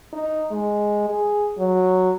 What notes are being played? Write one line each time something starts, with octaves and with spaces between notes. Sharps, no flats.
D#4
G#3
G#4
F#3